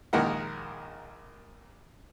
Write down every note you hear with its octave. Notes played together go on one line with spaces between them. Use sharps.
A#1 D#2 D#3 G#3 A#4 F#5